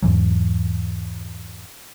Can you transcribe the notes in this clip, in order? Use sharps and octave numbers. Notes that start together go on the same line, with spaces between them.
E2 G#2 E3 F#3